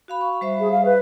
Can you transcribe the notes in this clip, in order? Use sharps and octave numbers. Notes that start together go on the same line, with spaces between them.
F#4 F5 B5
C#6
G3 C5 E5
G#4
F5
B4